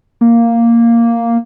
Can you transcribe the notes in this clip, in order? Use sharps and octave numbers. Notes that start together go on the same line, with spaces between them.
A#3